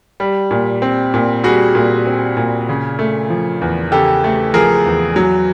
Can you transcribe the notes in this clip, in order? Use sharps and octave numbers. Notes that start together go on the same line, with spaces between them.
G3
A#2
C4
A#2
G3 F#4 G#4
A#2
C4
A#2
C#3
A3
F3
E2
C#3 G4 A4
A3
F3 G#4 A#4
E2
F#3